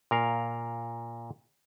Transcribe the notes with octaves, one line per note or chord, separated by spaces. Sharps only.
A#2 A#4 F5